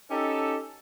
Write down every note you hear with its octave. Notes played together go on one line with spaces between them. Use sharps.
C#4 D#4 G4 A4